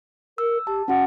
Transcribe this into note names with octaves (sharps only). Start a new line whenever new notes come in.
A#4 E6
G4 A5
C#4 F#4 F#5